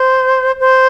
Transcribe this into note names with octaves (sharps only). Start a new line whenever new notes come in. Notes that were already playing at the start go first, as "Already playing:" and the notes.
Already playing: C5
C5